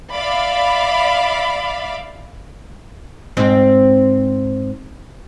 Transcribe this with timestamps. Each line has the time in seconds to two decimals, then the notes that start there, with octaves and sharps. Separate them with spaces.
0.14 D5 E5 F5 B5 D6
3.37 G#2 C4 C5